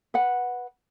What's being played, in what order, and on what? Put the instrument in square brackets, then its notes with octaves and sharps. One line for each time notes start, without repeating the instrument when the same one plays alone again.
[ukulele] B4 F#5